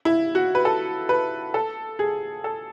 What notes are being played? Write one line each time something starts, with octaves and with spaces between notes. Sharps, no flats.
E4
F#4
B4
A4
B4
A4
G#4
A4